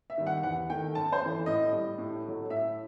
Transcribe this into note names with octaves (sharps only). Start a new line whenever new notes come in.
E5
D#3 G3
F#5
E2 F#5
D#3 A3 G5
F#2 A5
C5
E3 A3
A2 D#5
G3
A2
F#3 A3
A2 E5